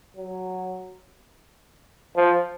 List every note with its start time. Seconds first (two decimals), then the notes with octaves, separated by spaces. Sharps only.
0.17 F#3
2.17 F3